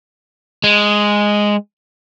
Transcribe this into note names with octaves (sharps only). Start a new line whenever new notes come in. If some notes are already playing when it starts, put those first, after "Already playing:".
G#3